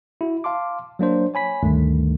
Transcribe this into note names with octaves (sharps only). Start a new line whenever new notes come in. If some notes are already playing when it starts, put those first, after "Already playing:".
E4 F#4
F5 A5 C6 D6
F#3 A#3 D4 C5
C#5 G#5 B5 B6
D2 G2 D#3 A3